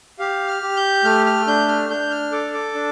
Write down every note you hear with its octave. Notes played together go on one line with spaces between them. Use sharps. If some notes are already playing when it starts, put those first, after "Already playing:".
G4 F5
F6
G4
G6
A3 F6
F6
D4 G6
F6
D4 G6
F6
A4 D6
D6
D4